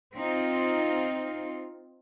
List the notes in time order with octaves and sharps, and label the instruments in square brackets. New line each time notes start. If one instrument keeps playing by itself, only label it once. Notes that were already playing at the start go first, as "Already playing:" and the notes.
[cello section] C4 D#4 F4